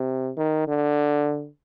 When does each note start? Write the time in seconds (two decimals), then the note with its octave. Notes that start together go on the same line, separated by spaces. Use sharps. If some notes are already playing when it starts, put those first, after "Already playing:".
Already playing: C3
0.37 D#3
0.68 D3